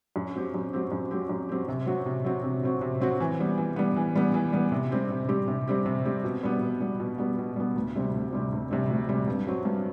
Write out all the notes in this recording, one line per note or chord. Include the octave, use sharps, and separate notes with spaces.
F#2
F#3 C4 G4
F#2
F#3 C4 G4
F#2
F#3 C4 G4
F#2
F#3 C4 G4
C3
F#3 C4 F#4
C3
F#3 C4 F#4
C3
F#3 C4 F#4
C3
F#3 C4 F#4
E3
G3 B3
E3
G3 B3
E3
G3 B3
E3
G3 B3
C3
G3 C4 G4
C3
G3 C4 G4
C3
G3 C4 G4
C3
G3 C4 G4
B2
G3 B3
B2
G3 B3
B2
G3 B3
B2
G3 B3
D2
C3 G3 C4
D2
C3 G3 C4
D2
C3 G3 C4
D2
C3 G3 C4
G2
F#3 C4
G2